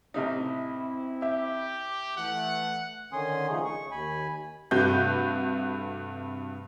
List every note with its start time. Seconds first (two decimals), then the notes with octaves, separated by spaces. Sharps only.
0.14 A1 C3 C4 D#4 E4
1.22 G4 E5
2.17 E3 A3 F#5
3.13 D3 D#3 C#4 G#5 C6 D#6
3.50 C#3 F3 A3 C#4 D#4 G#4
3.65 C#6
3.91 D#2 G#5 B5
4.71 G2 C3 A3 F#4 B4 G6